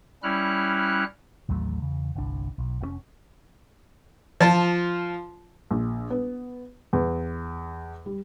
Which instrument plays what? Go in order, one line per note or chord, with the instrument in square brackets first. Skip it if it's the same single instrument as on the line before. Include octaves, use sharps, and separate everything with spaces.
[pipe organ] G3 C#4 E4 F6 F#6
[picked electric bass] A1 D#2 F#3 A3
E2 C#3
G1 C2 D4
B1
F1 A2 C#4
[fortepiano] F3 F4 A5
[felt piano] A#1
B3
E2
G3